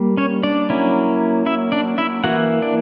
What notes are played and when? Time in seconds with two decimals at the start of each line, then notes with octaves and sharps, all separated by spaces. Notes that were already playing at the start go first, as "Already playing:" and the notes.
Already playing: G3 A#3
0.17 C#4 C#5
0.43 D4 D5
0.70 F#3 A#3 C#4 E4
1.46 E4 E5
1.72 D4 D5
1.98 E4 E5
2.24 E3 A#3 E4 F#4 F#5
2.62 D4 D5